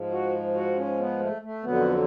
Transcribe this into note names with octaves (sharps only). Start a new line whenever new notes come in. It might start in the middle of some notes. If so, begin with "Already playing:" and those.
Already playing: G#2 F3
F#4
F#4
C#4
B3
A3
A3
F2 D3 F#3 B3